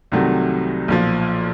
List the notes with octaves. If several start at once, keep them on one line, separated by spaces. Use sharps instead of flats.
C2 C3 D#3 F#3 A3
B1 A#2 F3